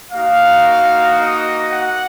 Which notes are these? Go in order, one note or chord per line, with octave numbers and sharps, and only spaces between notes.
A#3 D#4 F#4 F5
D#5
F#5